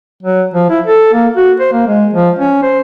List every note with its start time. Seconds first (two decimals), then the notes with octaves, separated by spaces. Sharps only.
0.23 F#3
0.54 F3
0.70 E4
0.87 A4
1.13 A#3
1.36 F#4
1.60 C5
1.72 A#3
1.88 G#3
2.13 F3
2.39 C#4
2.63 C5